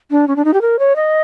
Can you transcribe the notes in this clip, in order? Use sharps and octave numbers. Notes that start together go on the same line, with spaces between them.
D4
C#4
D4
D#4
G4
A#4
C#5
D#5